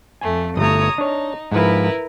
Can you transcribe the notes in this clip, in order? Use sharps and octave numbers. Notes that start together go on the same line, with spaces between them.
F2 A3 G#5
G1 A3 C#5 A#5 D#6
D4 D#4 C#5
G#2 F3 E4 A#4 B4